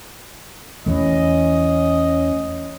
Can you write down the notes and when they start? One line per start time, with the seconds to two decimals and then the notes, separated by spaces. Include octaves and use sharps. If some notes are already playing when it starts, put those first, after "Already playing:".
0.86 E2 E3 A3 C#4 D#5